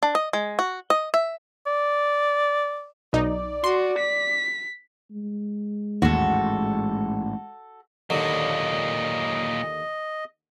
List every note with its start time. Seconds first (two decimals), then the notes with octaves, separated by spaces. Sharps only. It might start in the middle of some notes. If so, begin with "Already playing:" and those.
0.03 D4
0.15 D#5
0.33 G#3
0.59 F#4
0.90 D#5
1.14 E5
1.67 D5
3.13 B1 D#4 D5
3.64 F#4 C6
3.99 B6
5.11 G#3
6.02 A1 D#2 G#2 F#4 A4
8.10 D#2 A#2 D3 F#3 D#5